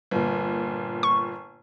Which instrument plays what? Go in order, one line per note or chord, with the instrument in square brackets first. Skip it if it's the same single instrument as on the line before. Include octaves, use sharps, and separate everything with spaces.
[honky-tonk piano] G1 A#2
[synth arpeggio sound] C#6